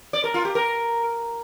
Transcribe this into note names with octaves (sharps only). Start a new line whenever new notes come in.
D5
A#4
F4
G4
A#4